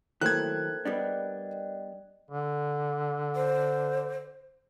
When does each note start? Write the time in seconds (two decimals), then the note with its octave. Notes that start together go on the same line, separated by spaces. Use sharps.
0.21 D#3 F#3 A3 A#3 C4 E4 F#6 G#6
0.85 G3 B3 D4 D5 D#5 G5
2.31 D3
3.36 C5